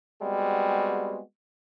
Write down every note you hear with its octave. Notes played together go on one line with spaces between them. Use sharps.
G3 G#3 B3 C4 F#4 G#4